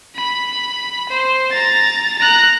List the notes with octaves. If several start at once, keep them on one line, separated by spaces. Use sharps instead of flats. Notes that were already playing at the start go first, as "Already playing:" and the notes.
B5
C5
A#5 A6
A#5 F#6